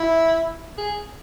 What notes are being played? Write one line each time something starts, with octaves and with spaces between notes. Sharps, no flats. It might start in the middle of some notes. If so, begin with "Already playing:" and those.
Already playing: E4
G#4